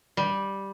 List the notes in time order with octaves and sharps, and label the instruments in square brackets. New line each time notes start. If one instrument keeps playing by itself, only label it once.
[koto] G3